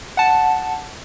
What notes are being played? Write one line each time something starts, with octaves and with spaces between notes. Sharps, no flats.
F#5 A5